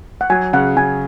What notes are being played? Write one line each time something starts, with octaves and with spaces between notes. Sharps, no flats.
F#5
F#3 G#5
C#3 F#5
C#3 G#5